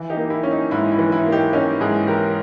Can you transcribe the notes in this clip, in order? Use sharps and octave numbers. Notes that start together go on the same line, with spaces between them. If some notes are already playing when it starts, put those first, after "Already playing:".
Already playing: E3
D#4 G4
A#3
E4
C#4
D#4
G#2 E4
E4
E3
E4
A#3
D#4 G4
C#4 D#4 G4
G#2 E4 G#4
E3 G4 A#4